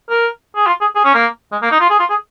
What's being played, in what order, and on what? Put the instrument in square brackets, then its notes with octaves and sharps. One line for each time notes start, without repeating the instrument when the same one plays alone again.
[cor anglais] A#4
G#4
F4
G#4
G#4
C#4
A#3
G#3
A#3
D#4
F4
G#4
F4
G#4